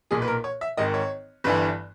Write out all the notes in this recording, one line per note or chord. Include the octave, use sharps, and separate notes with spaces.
B1 A#2 G#4
B4
A#4
C#5
E5
G#1 G#2 D#3 D#5
C#5
G1 G2 E3 B4